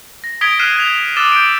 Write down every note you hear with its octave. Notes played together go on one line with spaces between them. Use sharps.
A#6
D#6 G#6 B6 D7 G7
F6 F#6 C7 D#7 E7
G#6 F7
D6 E6 F#6 A6 E7 G7
G6 D7